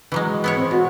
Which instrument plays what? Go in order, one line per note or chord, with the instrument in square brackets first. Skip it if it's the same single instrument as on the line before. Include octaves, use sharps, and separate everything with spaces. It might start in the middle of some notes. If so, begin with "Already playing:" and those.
[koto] E3 F#3 G#3
B3 E4 C#5
[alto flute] C4
[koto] B2 [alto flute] F#4